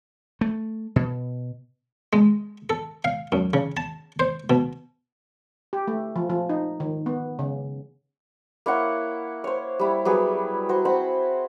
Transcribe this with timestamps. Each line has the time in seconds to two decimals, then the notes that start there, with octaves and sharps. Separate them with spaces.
0.41 A3
0.96 B2
2.13 G#3
2.70 A4
3.05 F5
3.32 F#2
3.54 C#3
3.77 A5
4.20 C5
4.50 B2
5.73 G4
5.87 A3
6.16 F3
6.30 F3
6.49 D#4
6.80 D#3
7.06 B3
7.39 C#3
8.66 A#3 E4 C#5 F#5
9.44 C5 C#5
9.80 G3 E4
10.05 F#3 G3 B3 G#4
10.69 F#4 C5
10.85 C4 C5 F#5 B5